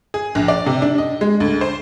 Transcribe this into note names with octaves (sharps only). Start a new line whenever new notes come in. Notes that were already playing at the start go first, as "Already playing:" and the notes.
G#4
A#1
D5
C3
D4
D#5
G#3
D2
C5